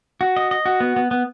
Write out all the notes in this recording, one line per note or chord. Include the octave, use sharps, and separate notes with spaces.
F#4
D#5
D#5
F#4
B3
B3
B3